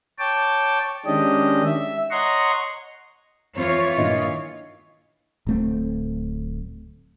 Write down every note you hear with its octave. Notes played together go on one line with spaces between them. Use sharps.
C#5 G5 A5 D6
D#3 G#3 C#4 D4 G4 D#5
E5
C#5 D#5 F#5 A#5 C6 C#6
F2 E3 F4 C#5 C#6
G2 A#2 D#3 D#5
D1 A3 C4